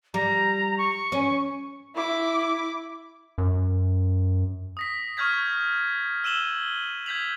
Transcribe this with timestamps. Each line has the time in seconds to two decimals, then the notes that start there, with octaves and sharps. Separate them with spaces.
0.14 G3 A#5
0.78 C#6
1.12 C#4
1.95 E4 D6
3.38 F#2
4.77 D#6 A#6 B6
5.17 C#6 D#6 F6 G6 G#6 B6
6.24 E6 D#7 E7 F#7 G7
7.06 G6 G#6 B6 F7 F#7